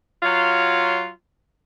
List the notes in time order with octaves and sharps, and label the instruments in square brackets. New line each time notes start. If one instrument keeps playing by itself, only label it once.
[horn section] F#3 F4